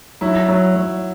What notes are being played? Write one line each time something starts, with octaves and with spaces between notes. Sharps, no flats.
F#3 E4
F#3
F#3